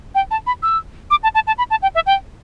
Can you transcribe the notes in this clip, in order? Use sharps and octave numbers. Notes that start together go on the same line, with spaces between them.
G5
A5
B5
E6
D6
A5
A5
A5
B5
A5
G5
E5
G5